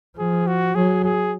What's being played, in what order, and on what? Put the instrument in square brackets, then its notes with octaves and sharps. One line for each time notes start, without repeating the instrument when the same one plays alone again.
[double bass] F3 [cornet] G#4
[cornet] F#4
[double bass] F#3 [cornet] G#4
[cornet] G#4